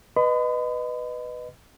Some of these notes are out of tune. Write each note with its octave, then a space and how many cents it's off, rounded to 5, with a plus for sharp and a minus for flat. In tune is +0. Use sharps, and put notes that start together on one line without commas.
B4 +0 D#5 -15 B5 +40